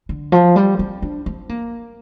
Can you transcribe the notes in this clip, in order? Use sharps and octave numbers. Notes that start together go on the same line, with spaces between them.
D3
F3
G3
C4
D4
C4
A#3